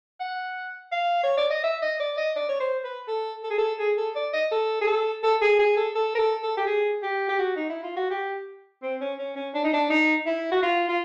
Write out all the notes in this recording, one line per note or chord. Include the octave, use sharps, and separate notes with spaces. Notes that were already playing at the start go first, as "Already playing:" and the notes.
F#5
F5
C#5
D5
D#5
E5
D#5
D5
D#5
D5
C#5
C5
B4
A4
A4
G#4
A4
G#4
A4
D5
D#5
A4
G#4
A4
A4
G#4
G#4
A4
A4
A#4
A4
A4
G4
G#4
G4
G4
F#4
D#4
E4
F4
F#4
G4
C4
C#4
C#4
C#4
D4
D#4
D4
D#4
E4
F#4
F4
F4